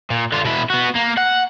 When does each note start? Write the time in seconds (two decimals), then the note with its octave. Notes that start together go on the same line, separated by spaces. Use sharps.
0.10 A#2
0.32 D3 F4
0.44 B2 E4
0.70 B3 F#4
0.95 A#3
1.18 F#5